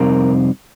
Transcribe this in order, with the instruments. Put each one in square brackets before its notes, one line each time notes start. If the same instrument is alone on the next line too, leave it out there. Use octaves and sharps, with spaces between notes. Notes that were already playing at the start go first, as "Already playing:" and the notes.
Already playing: [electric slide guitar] F2 C3 G3 C4 D#4 A#4